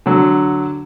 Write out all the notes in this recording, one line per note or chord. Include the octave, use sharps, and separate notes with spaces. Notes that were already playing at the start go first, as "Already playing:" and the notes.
D3 F#3